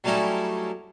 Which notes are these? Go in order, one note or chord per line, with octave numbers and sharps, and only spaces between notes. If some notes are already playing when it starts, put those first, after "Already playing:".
F#3 G3 A3 C#4 D#4 E4